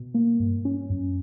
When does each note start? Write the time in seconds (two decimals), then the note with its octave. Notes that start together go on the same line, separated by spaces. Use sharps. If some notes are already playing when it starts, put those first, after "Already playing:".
Already playing: B2
0.14 A#3
0.40 G2
0.65 C#4
0.90 F#2